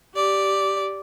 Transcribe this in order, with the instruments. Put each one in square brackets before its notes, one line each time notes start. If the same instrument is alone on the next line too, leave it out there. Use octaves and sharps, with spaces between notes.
[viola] G4 D5